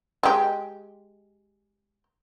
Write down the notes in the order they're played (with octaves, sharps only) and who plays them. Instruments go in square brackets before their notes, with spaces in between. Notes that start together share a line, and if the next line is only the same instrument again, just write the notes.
[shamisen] G#3 G4